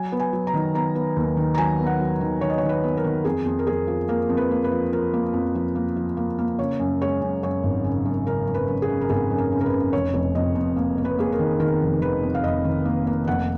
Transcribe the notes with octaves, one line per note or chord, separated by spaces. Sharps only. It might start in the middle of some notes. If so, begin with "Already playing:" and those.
Already playing: F#3 G#5
B3
G#5
F#3
A#5
D#3
B3 A#5
B3
D#2
D#3
A#5
F#3 G#5
B3
F#5
F#3
D#3
D#3 C#5
D#5
C#5
D#3
B4
B3
A#4
D#3
F2 G#4
F2
A#4
F2 G#4
F3
A#3 A#4
F2
B4
A#3
B4
F3
F3 A#4
A#3
F2
F3
A#3
F3
A#3
A#3
C#3 C#5
F#2
G#3 C#5
F#2
F#2 C#5
G#1
C#3
F#2
C#3 A#4
F#2
B4
F#2
G#4
C#3
A#4
G#1 G#4
F#2
A#4
C#3
A#4
B4
C#3
F1 C#5
F1
F2 D#5
F2
A#3
A#3
B4
A#3 G#4
A#4
D#3
D#3 A#4
F1
D#3 B4
F2
F5
F1 D#5
D#3
A#3
A#3
F1 F#5